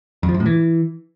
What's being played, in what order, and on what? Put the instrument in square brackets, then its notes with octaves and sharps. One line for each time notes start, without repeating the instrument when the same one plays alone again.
[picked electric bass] F2
F3
F#2
A2
E3